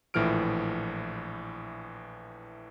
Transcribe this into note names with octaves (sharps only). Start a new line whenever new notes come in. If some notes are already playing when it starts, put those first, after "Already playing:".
A#1 A2 E3 F3 F6 D7